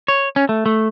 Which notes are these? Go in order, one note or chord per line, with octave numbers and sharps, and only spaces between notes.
C#5
C#4
A3
A3